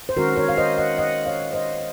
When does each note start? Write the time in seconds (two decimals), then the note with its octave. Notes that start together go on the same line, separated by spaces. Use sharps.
0.09 C5
0.16 D#3 G#3 C#4 F#4 A#4
0.36 A#4 C#5
0.49 F5
0.57 C5 D#5
0.78 D#5 F#5
0.98 D#5 F#5
1.26 C#5 F5
1.53 C5 D#5